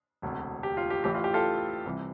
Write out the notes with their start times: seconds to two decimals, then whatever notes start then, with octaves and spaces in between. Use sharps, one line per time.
0.22 E1 D2 C3
0.63 G4
0.77 F4
0.90 G4
1.04 A1 A2 E3 G4
1.14 F4
1.24 G4
1.34 F4 A4
1.85 C2 C3 E3